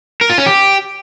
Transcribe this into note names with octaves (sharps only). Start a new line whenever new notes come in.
A#4
F4
C#4
G4